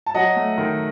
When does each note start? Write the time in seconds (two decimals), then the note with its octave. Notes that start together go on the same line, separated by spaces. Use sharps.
0.06 A5
0.14 F#3 D#5 F#5
0.36 A3
0.58 D#3